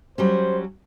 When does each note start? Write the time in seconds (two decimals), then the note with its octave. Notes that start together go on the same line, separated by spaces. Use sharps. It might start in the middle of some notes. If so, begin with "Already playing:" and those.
0.18 F#3 G3 C#4 C5